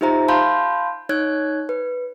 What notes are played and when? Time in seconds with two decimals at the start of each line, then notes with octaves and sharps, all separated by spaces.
0.01 D#4 F4 G4 C5 E5 A#5
0.28 F5 A5 B5 C6 G6
1.09 D#4 C#5 F#6 G#6
1.69 B4